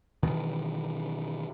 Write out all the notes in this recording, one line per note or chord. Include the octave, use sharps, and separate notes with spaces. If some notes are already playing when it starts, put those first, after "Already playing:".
B2 D#3 E3